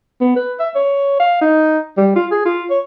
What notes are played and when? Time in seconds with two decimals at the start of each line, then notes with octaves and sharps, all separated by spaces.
0.21 B3
0.36 B4
0.59 E5
0.75 C#5
1.20 F5
1.41 D#4
1.97 G3
2.16 F4
2.32 G#4
2.45 F4
2.70 C#5